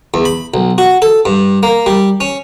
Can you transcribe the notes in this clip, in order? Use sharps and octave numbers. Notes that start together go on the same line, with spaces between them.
E2
B5
B1
F#4
A4
G2
A#3
G3
C#4